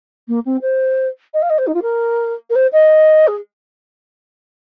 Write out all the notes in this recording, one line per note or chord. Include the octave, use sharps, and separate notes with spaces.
A#3
C4
C5
D#5
F5
D#5
C5
D#4
F4
A#4
A#4
C5
D#5
G#4